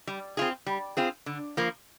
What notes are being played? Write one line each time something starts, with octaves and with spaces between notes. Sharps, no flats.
G3
C4 F4 G#4
G3
C4 F4 G#4
D3
F3 A#3